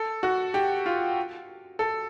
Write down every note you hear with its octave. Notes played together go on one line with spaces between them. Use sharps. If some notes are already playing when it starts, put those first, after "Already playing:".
Already playing: A4
F#4
G4
F4
A4